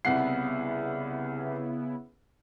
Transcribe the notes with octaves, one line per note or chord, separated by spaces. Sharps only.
C2 C#3 B3 E4 F#5 C7